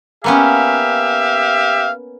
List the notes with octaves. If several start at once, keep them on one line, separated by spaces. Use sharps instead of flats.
A#3 B3 C#4 G4 E5 F5